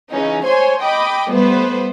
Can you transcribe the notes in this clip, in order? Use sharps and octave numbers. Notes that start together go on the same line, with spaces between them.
C#3 E3 C#4 D#4
C5 C#5 G#5 C6
D#5 G5 B5 D6
G3 A3 B3 B4 C5